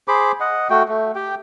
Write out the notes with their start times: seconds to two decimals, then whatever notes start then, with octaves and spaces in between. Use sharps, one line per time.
0.08 G#4 C5 B5 D6
0.40 D#5 F#5
0.70 A3 F#4 G5
0.88 A3
1.15 G4 G5